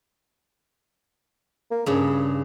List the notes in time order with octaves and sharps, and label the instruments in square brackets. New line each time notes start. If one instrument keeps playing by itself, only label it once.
[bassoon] A#3
[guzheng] G2 C#3 [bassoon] G#4